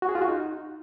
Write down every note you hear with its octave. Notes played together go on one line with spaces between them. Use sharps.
F#4
G#4
F4
F#4
D#4